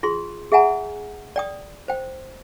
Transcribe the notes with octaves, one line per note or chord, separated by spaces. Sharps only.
F4 G#4 C6
G#4 E5 F#5 G#5 A#5
D5 G5 D#6
C5 G5